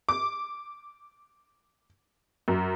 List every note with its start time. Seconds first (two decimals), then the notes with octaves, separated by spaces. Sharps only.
0.09 D6
2.48 F#2